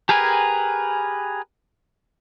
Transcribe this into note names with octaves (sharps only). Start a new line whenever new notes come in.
G4 G#4 A#4 B4 G#5